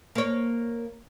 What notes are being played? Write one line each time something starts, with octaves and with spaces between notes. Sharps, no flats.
A#3 C#5